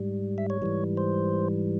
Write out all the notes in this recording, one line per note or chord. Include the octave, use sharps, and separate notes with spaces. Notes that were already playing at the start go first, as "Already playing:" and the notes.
Already playing: G#2 G3
E5
C#5
G#2 E3 G3
C5